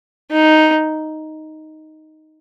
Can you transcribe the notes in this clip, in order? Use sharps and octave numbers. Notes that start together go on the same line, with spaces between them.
D#4